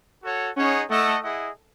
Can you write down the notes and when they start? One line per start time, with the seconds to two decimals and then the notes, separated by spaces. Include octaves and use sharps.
0.23 F#4 A4 C#5 F#5
0.56 C#4 D#4 G#4 C#5 F#5
0.90 A3 E4 A4 D#5 F#5
1.23 E4 G#4 D#5 F#5